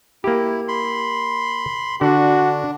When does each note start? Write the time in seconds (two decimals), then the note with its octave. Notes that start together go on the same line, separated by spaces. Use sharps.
0.24 A#3 E4 G4
0.68 B5 C6
2.01 D3 D4 F#4